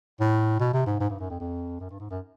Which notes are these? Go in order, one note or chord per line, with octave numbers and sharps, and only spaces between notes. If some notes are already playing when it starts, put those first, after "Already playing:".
A2
B2
C3
G#2
G#2
G2
F#2
F2
F2
F#2
G2
G#2
F#2